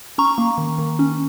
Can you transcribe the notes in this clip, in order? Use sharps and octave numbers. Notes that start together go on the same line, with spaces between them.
C#4 A#5 C#6
A#3
D#3
D#3
C#4